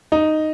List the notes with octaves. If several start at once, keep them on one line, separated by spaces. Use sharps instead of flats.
D#4